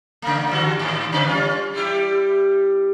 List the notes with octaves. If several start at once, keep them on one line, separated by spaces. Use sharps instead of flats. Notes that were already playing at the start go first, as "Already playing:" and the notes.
C#3 A3
G2 D3 F#4
G#2 D#3
C#3 C4 B4
G3 C#4 F4
G3 E4 G4